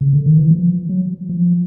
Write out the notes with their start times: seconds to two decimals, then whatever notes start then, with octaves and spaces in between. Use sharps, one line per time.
0.01 C#3
0.13 D3
0.26 D#3
0.38 E3
0.51 F3
0.89 F#3
1.29 F3